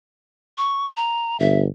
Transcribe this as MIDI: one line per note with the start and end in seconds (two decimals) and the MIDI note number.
0.58 0.86 85
0.97 1.37 82
1.40 1.66 31
1.40 1.60 76